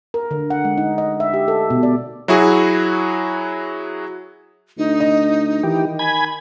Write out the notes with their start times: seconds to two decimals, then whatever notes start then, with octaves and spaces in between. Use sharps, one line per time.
0.14 A#4
0.31 D3
0.50 F#5
0.65 G#3
0.78 D#4
0.98 D#5
1.20 E5
1.34 G4
1.48 A4
1.70 B2
1.83 D5
2.28 F#3 E4 F#4 G#4
4.78 D2 D#4
5.00 D#5
5.63 D#3 E3 G4
5.99 G#5 B5 G#6